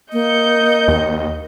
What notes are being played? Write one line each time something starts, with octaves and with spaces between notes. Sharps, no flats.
A#3 D#5 G6 C#7
D#2